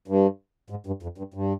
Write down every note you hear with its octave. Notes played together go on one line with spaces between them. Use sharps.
G2
G#2
G2
F2
G2
G2